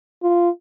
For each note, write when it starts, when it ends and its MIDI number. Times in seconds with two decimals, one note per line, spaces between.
0.23 0.49 65